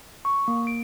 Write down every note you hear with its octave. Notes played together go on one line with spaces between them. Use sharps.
C#6
A#3
D7